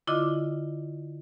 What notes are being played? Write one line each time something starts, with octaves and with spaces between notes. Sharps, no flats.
D3 E4 F4 D#5 D6